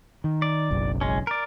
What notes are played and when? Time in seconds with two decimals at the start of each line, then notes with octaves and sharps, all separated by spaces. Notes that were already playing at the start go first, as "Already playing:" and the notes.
0.24 D#3
0.42 D5
0.71 F#1 B1 F#2
1.01 G#3 C#4
1.27 A#4 D5